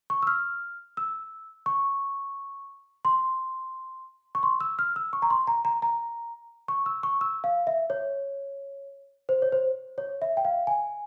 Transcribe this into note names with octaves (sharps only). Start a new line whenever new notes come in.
C#6
E6
F6
E6
C#6
C6
C#6
C6
E6
F6
E6
C#6
A#5
C6
A#5
A#5
A#5
C#6
E6
C#6
E6
F5
E5
C#5
C5
C#5
C5
C#5
E5
G5
F5
G#5